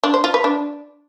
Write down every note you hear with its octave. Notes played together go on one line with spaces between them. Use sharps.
D4
C5
F4
B4
D4